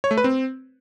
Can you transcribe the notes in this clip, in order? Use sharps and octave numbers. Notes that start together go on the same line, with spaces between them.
C#5
A3
B4
C4